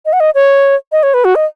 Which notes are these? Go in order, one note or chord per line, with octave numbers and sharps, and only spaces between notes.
D#5
F#5
D#5
C#5
D#5
C#5
B4
F#4
D#5